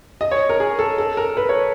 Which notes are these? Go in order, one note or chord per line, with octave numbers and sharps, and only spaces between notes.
D#5
C#5
A#4
G#4
A4
A4
A#4
B4
C#5